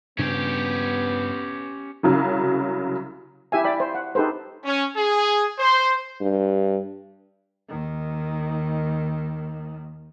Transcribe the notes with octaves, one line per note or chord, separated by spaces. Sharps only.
G2 C#3 B3 C#4 D4 G4
C2 C#3 F#3
E4 G4 E5 G#5
D5 G5 B5
C5
F#5
D#4 G4 A4 B4 C5
C#4
G#4
C5
G2
D#2 D#3